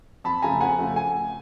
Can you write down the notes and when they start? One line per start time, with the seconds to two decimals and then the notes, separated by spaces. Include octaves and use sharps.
0.24 F2 A5 B5
0.42 C#3 F3 A3 G#5 A#5
0.61 F2 F#5 G#5
0.78 C#3 F3 A3
0.96 G#5